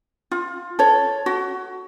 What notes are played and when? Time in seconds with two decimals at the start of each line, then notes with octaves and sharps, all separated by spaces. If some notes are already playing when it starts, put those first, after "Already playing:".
0.32 F4
0.79 A4 C#5
1.26 F#4